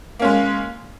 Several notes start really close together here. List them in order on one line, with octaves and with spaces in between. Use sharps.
A#3 C#4 G#3